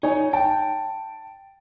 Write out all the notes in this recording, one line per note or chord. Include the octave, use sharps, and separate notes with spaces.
D#4 C#5 G#5
G5 A5